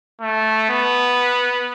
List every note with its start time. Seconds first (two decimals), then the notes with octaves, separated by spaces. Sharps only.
0.21 A3
0.70 B3